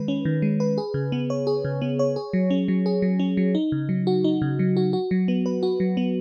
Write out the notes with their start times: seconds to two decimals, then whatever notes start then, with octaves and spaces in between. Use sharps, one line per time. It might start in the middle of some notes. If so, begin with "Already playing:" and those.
Already playing: D#3 G#3 B4
0.08 C#4
0.25 D#3
0.42 G#3
0.60 B4
0.78 G#4
0.94 C#3
1.12 B3
1.30 C#5
1.47 G#4
1.65 C#3
1.82 B3
1.99 C#5
2.16 G#4
2.33 F#3
2.50 C#4
2.68 F#3
2.86 G#4
3.02 F#3
3.19 C#4
3.37 F#3
3.55 D#4
3.72 C#3
3.89 F#3
4.07 F#4
4.24 D#4
4.42 C#3
4.59 F#3
4.77 F#4
4.93 F#4
5.11 F#3
5.28 B3
5.46 B4
5.63 F#4
5.80 F#3
5.97 B3